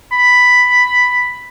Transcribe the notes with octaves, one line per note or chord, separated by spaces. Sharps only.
B5